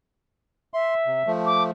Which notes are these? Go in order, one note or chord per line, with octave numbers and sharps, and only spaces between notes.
E5 C6
C3
F3 A3
D6